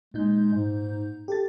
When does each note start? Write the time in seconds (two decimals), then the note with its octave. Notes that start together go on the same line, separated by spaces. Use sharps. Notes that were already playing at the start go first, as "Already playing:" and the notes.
0.14 A#2 G#3 D#4 G6
0.53 G#2
1.28 G4 A4 A6